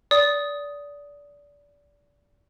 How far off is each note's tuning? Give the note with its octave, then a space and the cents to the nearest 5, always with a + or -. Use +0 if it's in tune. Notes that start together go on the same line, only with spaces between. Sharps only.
D5 -25 D#6 +0